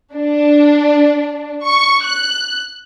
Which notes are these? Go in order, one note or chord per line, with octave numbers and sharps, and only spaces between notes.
D4
C#6
F#6